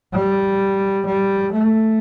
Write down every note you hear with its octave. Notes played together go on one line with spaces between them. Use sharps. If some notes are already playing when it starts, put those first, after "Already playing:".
G3
G3
A3